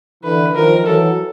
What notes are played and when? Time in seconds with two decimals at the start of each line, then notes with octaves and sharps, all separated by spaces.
0.24 D3 E3 B4
0.54 D#3 F3 A#4
0.86 E3 F#3 A4